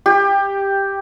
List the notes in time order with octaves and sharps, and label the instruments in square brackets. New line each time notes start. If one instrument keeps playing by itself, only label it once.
[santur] G4